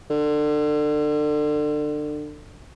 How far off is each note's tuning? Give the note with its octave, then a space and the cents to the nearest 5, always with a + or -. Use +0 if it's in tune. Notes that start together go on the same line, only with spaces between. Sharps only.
D3 +30